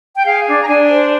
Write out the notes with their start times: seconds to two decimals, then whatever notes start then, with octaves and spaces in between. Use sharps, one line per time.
0.15 G5
0.25 G#4 F5
0.47 D4
0.62 A#5
0.68 D4 G#5
0.89 C5